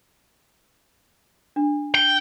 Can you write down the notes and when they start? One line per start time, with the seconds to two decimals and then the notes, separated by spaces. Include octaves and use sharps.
1.56 D4
1.95 G5